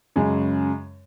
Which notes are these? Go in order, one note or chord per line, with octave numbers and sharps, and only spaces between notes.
F#2 C#3 G#3